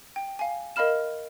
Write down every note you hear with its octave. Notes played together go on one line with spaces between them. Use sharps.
G5
F5 G#5
A#4 D#5 F5 B5 F6 E7